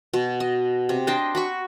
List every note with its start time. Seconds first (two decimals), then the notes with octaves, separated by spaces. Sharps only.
0.14 B2
0.40 D#5
0.89 C3
1.07 D4 C5 D#5 G5
1.35 F#4 B5 C#6